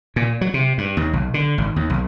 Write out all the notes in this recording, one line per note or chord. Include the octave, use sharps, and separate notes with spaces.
A#2
F#3
C3
G2
D#2
B1
D3
G#1
D#2
B1